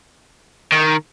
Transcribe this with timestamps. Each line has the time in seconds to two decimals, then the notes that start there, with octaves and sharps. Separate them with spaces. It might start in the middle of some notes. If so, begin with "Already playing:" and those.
0.72 D#3